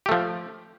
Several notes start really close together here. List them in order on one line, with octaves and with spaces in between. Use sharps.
G4 A3 F3